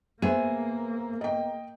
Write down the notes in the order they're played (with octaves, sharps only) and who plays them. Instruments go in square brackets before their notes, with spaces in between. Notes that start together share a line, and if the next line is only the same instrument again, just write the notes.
[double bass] A#3 [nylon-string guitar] B3 G#4 [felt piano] C5 E5 D#7
[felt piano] D#5 G5